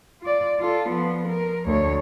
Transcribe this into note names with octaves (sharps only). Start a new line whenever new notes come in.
F4 D5
F4 A4
F3 B3
A#4
D2 C#5